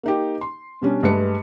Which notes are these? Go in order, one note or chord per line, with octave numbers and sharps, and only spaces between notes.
A#3 D#4 G4
C6
B2 G3 C#4 D4
G2 G#3 A3 B4 C#7